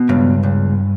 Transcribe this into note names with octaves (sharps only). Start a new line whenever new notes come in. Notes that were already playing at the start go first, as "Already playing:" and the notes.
Already playing: B2
C#2 G2
C#2